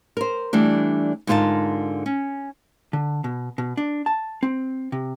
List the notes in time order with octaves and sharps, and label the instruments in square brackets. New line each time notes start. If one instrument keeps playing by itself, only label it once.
[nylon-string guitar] A#4 C5
E3 G3 A3 D4
G#2 D3 F4 G4 A#4 A5
C#4
[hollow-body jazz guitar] D3
B2
B2
D4
A5
C4
C3